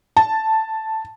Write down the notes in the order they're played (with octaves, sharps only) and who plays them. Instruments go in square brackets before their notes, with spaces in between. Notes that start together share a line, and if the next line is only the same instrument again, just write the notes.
[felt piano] A5